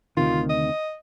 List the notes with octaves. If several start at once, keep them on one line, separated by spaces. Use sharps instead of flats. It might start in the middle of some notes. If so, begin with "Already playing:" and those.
D2 C3 D#3 F4
D#5